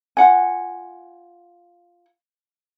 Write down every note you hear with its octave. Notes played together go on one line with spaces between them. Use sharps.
F4 F#5 G#5